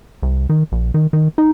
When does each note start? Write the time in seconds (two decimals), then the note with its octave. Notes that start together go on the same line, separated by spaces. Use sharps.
0.23 C2
0.49 D#3
0.72 A#1
0.94 D#3
1.13 D#3
1.38 D#4